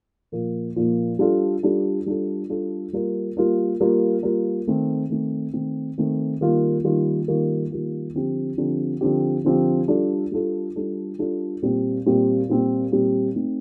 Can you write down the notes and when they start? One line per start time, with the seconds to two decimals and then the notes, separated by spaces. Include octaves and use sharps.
0.32 A#2 F3 A#3
0.76 A#2 F3 A#3
1.19 G3 D4 F4 A4
1.63 G3 D4 F4 A4
2.06 G3 D4 F4 A4
2.49 G3 D4 F4 A4
2.93 G3 A#3 F4 A#4
3.37 G3 A#3 F4 A#4
3.80 G3 A#3 F4 A#4
4.23 G3 A#3 F4 A#4
4.67 D#3 A3 C4
5.10 D#3 A3 C4
5.53 D#3 A3 C4
5.98 D#3 A3 C4
6.41 D#3 G3 A#3 F4
6.84 D#3 G3 A#3 F4
7.28 D#3 G3 A#3 F4
7.71 D#3 G3 A#3 F4
8.14 D3 F3 C4 G4
8.58 D3 F3 C4 G4
9.01 D3 F3 C4 G4
9.44 D3 F3 C4 G4
9.88 G3 D4 F4 A4
10.32 G3 D4 F4 A4
10.76 G3 D4 F4 A4
11.19 G3 D4 F4 A4
11.62 A#2 G3 C4 G4
12.06 A#2 G3 C4 G4
12.49 A#2 G3 C4 G4
12.92 A#2 G3 C4 G4
13.36 A3 C4 D#4